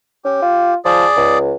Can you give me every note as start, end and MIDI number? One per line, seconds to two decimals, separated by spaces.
0.25 0.41 61
0.25 0.74 67
0.42 0.75 65
0.85 1.05 53
0.85 1.38 68
0.85 1.38 74
1.16 1.54 37